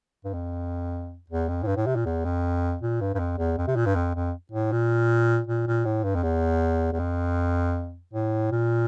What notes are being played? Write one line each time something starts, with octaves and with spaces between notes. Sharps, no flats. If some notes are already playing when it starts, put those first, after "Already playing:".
G2
F2
E2
F2
A2
G2
A2
C3
A#2
E2
F2
A#2
G2
G2
F2
E2
F2
C3
A#2
G2
F2
F2
A2
A#2
A#2
A#2
A2
G2
F2
E2
E2
F2
A2
A#2